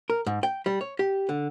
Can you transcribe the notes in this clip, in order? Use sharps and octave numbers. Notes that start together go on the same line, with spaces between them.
A#4
G#2
G5
G3
C#5
G4
D3